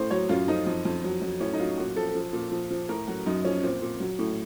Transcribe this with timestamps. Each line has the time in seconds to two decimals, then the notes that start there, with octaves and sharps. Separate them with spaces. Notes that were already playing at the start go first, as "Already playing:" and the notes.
Already playing: A2 C5
0.11 F#3 C#5
0.29 F#2 F4
0.48 F3 D#4
0.67 F2
0.85 F2
1.04 F#3
1.22 F#3
1.40 A2 C#4
1.54 D#4
1.59 F#3 F4
1.78 A#2 F#4
1.96 F3 A4
2.15 F3
2.33 A#2
2.52 F3
2.70 F3
2.89 A2 A#4
3.08 F#3 F#4
3.26 F#2 D#4
3.45 F3 C#4
3.63 A#2 C4
3.82 A#2
4.00 F#3
4.19 A2